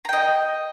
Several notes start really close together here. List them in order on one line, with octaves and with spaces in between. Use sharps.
A#5 G5 D#5